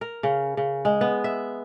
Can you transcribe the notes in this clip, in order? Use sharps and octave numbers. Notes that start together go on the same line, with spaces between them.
A#4
C#3
C#3
G#3
B3
E5